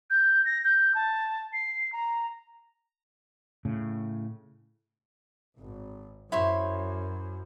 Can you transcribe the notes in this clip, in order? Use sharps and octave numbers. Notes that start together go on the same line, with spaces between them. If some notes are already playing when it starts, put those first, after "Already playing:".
G6
A#6
G6
A5
C7
A#5
A2 C#3
G#1
F#2 E4 C5 C#5